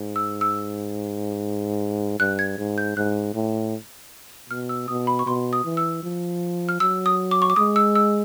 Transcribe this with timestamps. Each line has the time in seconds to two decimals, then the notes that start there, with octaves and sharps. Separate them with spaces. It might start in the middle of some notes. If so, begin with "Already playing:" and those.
Already playing: G#2
0.16 E6
0.41 E6
2.20 G2 F#6
2.39 G#6
2.58 G#2
2.78 G6
2.97 G#2 F#6
3.35 A2
4.50 B2 F6
4.69 E6
4.88 B2 D#6
5.07 B5
5.19 C#6
5.26 B2 C6
5.53 D#6
5.64 E3
5.77 E6
6.03 F3
6.69 F6
6.80 F#3 E6
7.06 D#6
7.31 D6
7.42 C#6
7.50 D6
7.56 G#3 D#6
7.76 E6
7.95 E6